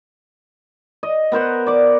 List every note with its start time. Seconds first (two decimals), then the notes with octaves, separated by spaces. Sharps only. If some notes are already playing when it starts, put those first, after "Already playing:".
1.03 D#5
1.32 B3 A#4 C5 F#5
1.67 D5 D6